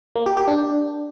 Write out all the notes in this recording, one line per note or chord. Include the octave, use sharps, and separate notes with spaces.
A#3
G4
G4
D4